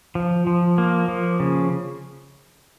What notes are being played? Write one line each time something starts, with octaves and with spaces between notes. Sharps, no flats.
F3
F3
A#3
F3
C#3